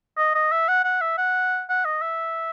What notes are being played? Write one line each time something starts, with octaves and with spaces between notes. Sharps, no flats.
D#5
D#5
E5
F#5
F#5
E5
F#5
F#5
D#5
E5